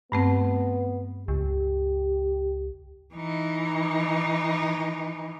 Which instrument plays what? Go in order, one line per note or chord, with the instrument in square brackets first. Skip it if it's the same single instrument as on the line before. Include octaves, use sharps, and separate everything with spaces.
[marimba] G2 A3 C4 [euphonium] B3
[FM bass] C#2 [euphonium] G4
[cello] E3 D#4